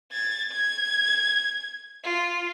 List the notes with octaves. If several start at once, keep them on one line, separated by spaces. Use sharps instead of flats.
G#6 A6
G#6
F4